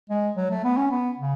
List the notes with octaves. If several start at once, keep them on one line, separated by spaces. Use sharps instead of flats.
G#3
F#3
A3
B3
C#4
B3
C#3